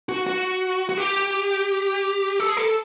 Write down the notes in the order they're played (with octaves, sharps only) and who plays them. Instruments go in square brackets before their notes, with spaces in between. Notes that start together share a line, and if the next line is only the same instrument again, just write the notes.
[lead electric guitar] F#4
F#4
F#4
G4
A4
G#4
A4